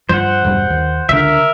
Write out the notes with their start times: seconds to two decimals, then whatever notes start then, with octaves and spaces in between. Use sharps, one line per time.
0.09 G2 F3 C5 F#5
0.44 E1 G2 G3
0.70 D#2
1.09 C#2 D3 A#4 E5